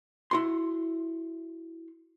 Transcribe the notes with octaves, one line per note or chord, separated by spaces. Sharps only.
E4 F#4 C6